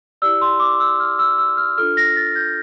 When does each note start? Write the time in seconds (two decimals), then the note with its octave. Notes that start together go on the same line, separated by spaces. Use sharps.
0.22 E4 G4 D5 E6
0.41 C6
0.60 D6
0.80 E6
1.00 F6
1.19 E6
1.38 E6
1.57 F6
1.78 D4 F4 A4 F6
1.97 A#6
2.17 A6
2.35 G6